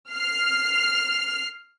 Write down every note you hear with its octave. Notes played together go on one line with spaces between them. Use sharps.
F6 C7